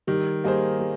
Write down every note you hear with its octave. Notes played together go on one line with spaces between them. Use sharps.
D#3 G3
G3 A#3 D#4 G#4 C5
G3